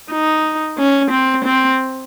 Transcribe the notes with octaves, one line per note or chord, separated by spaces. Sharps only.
D#4
C#4
C4
C4